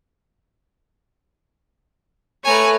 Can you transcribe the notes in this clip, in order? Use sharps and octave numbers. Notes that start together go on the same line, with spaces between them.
A3 B4 C#5 G#5 A#5